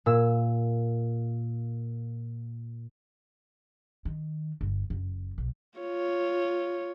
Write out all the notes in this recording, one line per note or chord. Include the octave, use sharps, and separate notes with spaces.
A#2 E6
D#3
G1
F#1
B1
F4 C#5